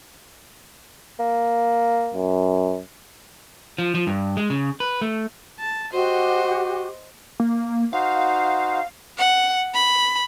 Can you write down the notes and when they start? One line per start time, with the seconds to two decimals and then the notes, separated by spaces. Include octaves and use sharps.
1.19 A#3
2.14 F#2
3.78 F3
3.95 F3
4.07 G2
4.37 G#3
4.50 C#3
4.80 B4
5.01 A3
5.59 A5
5.93 F#4 G4 C5 D#5
7.40 A#3
7.93 D#4 F#4 C5 F5
9.18 F#5
9.74 B5